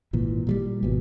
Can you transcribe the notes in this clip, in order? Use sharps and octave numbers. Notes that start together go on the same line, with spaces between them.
G#1 A#2 E3
A#2 F#3 G3
G#1 B2